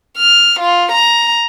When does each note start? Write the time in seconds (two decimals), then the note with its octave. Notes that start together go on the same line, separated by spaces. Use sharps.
0.18 F6
0.60 F4
0.92 A#5